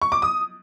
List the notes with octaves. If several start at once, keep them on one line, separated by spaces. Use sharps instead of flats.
C#6
D6
D#6